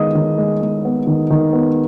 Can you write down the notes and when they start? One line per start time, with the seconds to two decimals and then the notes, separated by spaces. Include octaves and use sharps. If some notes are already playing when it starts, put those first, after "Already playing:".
Already playing: D#3 G#3 B3 D#5 D#6
0.15 D#3
0.38 G#3
0.62 G#3
0.85 B3
1.07 D#3
1.30 D#3
1.53 B3